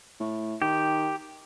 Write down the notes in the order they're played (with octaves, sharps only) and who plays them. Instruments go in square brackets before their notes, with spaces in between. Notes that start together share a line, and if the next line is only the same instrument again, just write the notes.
[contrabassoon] A2
[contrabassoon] D#3 [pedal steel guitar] G4